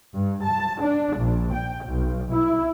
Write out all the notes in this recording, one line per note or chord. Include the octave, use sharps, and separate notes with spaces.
G2
A5
D4
A#1
G5
B1
E4